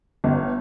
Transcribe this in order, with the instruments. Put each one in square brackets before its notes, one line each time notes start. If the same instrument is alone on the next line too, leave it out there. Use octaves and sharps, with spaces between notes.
[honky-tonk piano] G1